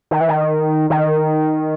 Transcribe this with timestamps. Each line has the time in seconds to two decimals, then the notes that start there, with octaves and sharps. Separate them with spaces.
0.11 D#3
0.21 E3
0.28 D#3
0.90 D#3